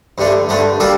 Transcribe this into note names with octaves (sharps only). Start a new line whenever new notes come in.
G2 D3 A3 D4
G2 D3 A3 D4
G3 A#3 D4 A4 D5